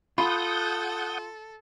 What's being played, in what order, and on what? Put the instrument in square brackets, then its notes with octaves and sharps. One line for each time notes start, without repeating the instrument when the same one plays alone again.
[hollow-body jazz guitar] F4 [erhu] A4 [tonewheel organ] F#5 D#6 G6 [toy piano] B5